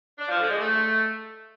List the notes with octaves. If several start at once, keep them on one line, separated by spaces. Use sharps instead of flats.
D4
F3
D3
G#3
A3